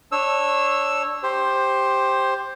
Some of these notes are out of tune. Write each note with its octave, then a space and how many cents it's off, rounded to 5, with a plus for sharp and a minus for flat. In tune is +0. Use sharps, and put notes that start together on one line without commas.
D4 +0 C#5 -20 E6 +0
G4 +0 C5 +10